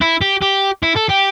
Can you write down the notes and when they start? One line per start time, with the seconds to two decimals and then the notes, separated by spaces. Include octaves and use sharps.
0.01 E4
0.21 G4
0.42 G4
0.83 E4
0.96 A4
1.09 G4